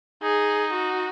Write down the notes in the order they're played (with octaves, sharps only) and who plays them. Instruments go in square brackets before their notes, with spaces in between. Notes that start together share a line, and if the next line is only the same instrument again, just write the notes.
[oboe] D#4 [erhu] G#4
[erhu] F#4